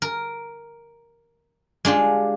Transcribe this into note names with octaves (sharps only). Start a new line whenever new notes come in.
A#4
G#3 D4 F4 G4